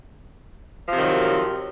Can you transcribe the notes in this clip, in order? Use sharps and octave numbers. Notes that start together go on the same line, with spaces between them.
C3 D#3 F3 F#3